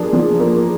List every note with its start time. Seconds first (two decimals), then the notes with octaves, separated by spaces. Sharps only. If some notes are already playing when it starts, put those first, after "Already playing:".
Already playing: F3 A#3 D4 G#4
0.13 F3
0.40 A#3